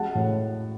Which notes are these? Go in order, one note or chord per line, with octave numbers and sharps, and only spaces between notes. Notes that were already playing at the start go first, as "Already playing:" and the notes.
Already playing: F#3 G#3 F#5 A5
A2